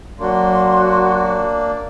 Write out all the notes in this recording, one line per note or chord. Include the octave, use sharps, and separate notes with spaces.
F#3 A#3 D4 F#4 C6